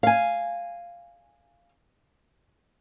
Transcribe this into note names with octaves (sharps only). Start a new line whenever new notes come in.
F5 G#5